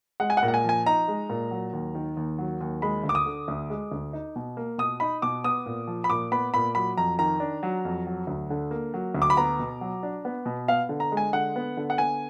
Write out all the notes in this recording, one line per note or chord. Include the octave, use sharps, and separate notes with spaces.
G#3 F#5
G#5
F#5
A#2
F#5
G#5
F3 G#5
D#4 A#5
G#3
A#2
F#3
D#2
D#3
D#2
F#3
D#2
G#3 B5
D2
D6
D#6
D3
D2
G#3
D2
D#4
B2
A#3
B2 D#6
D#4 B5
B2 D6
B3 D#6
A#2
F3
B5
A#2 D6
B3 B5
A#2 B5
F#3 B5
F2 A#5
D#3 A#5
D4
F#3
F2
F#3
D2
D3
A#3
F#3
D2
D6
B5
B3 A#5
B2
F#3
D4
B3
B2
B3 F5
D3
A#5
G#3
G#5
D3 F#5
B3
D3
F#5
B3 G#5